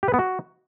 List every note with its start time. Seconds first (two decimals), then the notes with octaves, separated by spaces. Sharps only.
0.03 G4
0.08 B4
0.14 B3
0.19 F#4